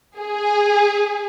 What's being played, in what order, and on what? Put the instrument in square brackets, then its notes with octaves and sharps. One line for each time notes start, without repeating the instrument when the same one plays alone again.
[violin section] G#4